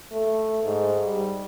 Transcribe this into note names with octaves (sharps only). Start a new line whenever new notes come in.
A3
G#2
G3